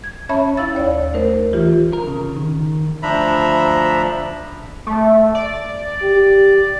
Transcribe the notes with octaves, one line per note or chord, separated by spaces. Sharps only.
G#6
C#4 C#5 E5 A5 B5
D#4 E4 F5 E6 A6
D#2 C#5 D5
A3 D#4 A#4 C5
E3 F4 G4
A#4
C#3
D#3
D2 F3 D4 E5 A#5 B5
A3
D5
G4